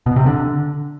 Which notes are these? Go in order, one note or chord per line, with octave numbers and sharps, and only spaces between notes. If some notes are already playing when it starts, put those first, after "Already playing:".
B2
C3
D3